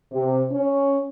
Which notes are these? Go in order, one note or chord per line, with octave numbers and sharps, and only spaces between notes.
C3
C#4